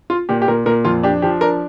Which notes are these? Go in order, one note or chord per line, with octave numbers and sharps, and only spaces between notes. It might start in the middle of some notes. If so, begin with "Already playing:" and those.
F4
A#2 G4
G4
A#2 A#4
A#2 A#4
F2 F4
D4 G4
F3 G4
D4 A#4